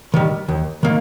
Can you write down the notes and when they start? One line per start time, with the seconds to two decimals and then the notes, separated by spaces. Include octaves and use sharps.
0.14 D#3 G3
0.49 D#2
0.83 D#3 A#3